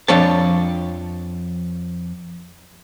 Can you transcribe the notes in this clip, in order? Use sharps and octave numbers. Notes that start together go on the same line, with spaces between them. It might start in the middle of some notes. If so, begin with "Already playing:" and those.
F2 F3 D4 C#5 A5